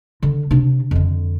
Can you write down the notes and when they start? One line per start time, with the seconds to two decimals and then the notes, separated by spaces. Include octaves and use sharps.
0.22 D3
0.51 C3 D4
0.91 F2 D3